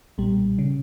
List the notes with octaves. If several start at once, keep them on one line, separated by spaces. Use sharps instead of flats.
B1 A#2 G3
C#3